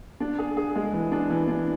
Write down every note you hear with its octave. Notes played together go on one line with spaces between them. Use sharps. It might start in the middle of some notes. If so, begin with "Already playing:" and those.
D4
G#4
G#4
G#3
E3
D4
E3
D4